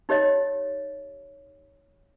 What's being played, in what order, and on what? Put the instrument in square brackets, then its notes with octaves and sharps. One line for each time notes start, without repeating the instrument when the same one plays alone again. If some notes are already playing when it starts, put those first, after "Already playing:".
[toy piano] D#4 G4 C#5 D#5